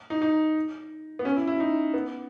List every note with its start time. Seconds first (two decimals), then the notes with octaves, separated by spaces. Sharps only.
0.10 D#4
0.22 D#4
1.19 B3
1.25 C#4
1.36 E4
1.47 E4
1.60 D#4
1.94 B3